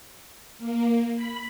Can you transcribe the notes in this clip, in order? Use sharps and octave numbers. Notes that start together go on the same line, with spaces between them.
A#3
B5